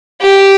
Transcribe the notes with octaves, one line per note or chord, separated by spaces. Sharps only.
G4